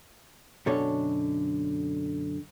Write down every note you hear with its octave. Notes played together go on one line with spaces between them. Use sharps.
F#2 B2 D3 A4 C#5